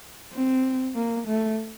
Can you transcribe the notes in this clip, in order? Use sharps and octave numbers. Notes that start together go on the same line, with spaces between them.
C4
A#3
A3